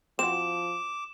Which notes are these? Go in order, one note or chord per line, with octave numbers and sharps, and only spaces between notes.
F3 C4 F#4 D6 E7